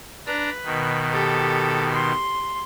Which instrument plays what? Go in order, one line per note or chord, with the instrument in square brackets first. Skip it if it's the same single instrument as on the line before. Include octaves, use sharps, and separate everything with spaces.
[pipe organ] D4 A#5 [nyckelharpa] B4
[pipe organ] B2 D#3
[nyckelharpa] G4 A4
C6